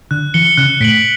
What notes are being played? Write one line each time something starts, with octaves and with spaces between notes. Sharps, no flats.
D3 F#6
E3 C#7 G7
C#3 F#6
A2 B6 D7 F#7